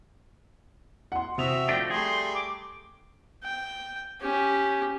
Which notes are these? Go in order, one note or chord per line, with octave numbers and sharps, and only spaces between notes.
F#5 C6
C3 C4 F#4 E5 D#6 F7
F3 A3 D4 G5 A#6 D7
G3 A3 G#4 G5 C6
D6
G5
C#4 G4